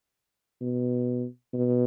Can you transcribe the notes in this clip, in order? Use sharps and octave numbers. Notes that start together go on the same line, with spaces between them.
B2
B2